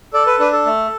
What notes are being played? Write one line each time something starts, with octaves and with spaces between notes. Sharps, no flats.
A4 D5
B4
D4 B4
A4
A3